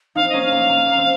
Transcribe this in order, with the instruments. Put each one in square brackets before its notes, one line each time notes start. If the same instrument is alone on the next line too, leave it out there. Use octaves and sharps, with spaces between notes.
[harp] C4 D#4 [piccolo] F5
[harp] A#3 C#4 [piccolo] D#5
[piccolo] F5
[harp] A#3
A#3
A#3
C4